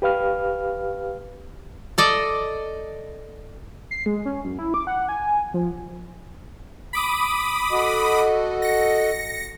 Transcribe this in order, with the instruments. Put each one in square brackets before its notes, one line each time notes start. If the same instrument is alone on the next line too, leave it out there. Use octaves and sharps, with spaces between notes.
[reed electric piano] G4 B4 F5 F6
[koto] A4 D5 D#5
[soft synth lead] C7
G#3
C#4
F#2
E4
D6
F#5
G#5
F3
[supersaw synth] B5 D6 D#6
[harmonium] F#4 A4 D#5
[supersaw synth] A#6 C#7